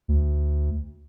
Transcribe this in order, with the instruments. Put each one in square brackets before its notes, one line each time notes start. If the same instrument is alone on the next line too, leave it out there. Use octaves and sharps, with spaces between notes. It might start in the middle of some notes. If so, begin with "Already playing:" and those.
[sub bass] D2